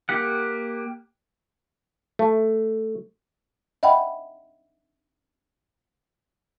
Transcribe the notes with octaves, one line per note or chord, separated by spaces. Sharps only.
A#3 G4 F#5
A3
D#5 E5 F#5 G5 B5